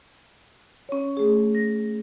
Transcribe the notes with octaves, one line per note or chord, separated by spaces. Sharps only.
C#4 C#5
A3 G#4
A#6